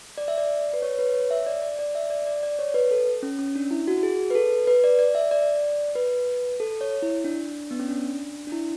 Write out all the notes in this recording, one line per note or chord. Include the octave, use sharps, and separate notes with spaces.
D5
E5
D5
B4
C#5
B4
C#5
E5
D5
D5
D5
E5
D5
D5
D5
C#5
B4
A4
C#4
C#4
D4
E4
F#4
F#4
G#4
B4
A4
B4
D5
D5
E5
D5
B4
A4
C#5
E4
D4
B3
C#4
D4
D4
E4